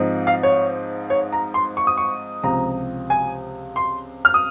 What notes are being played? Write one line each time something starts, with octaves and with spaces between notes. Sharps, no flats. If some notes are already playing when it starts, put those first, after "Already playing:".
Already playing: G#2 F3 C4 D#4
F5
C#5
C#5
A#5
C6
C#6
D#6
C#6
C#2 C3 F3 C4 A#5
G#5
C6
F6
D#6